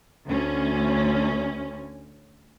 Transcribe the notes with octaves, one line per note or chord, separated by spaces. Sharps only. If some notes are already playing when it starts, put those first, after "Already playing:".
D2 C#4